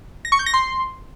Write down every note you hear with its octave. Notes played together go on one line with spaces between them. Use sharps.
A#6
C#6
G6
A#6
C6